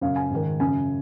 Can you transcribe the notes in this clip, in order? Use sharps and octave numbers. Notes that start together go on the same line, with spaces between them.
F#2 C#3 F5
G#5
G#2 D#3
F#2 C#3 G#5